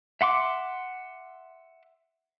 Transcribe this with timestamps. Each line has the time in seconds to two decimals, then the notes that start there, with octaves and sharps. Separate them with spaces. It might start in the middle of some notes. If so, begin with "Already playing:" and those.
0.21 E5 F#5 C6 D6